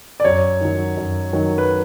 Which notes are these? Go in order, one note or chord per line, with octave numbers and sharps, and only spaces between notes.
D5
F#2 C#5
D#3 F#3
F#2
D#3 F#3
B4